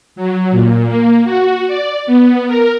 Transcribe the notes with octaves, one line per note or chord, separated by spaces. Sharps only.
F#3
A#2
A#3
F#4
D5
B3
A#4